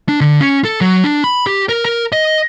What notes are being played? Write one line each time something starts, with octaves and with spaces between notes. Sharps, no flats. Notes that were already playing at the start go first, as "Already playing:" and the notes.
D4
D3
C#4
A4
F#3
D4
B5
G4
A#4
A#4
D#5